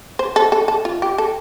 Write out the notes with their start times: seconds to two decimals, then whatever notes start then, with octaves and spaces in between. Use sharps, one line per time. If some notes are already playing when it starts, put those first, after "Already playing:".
0.19 C5
0.36 A4
0.52 A4
0.68 A4
0.85 F4
1.02 G4
1.18 A4